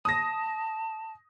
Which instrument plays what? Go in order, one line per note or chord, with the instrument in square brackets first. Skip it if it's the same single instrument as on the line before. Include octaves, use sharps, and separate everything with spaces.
[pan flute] A5 [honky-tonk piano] D#6 A#6